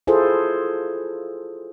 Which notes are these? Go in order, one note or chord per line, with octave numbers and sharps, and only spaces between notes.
E4 F4 G#4 A4 C5